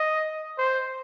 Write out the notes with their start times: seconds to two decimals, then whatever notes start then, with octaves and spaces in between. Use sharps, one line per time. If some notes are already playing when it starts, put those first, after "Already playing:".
Already playing: D#5
0.58 C5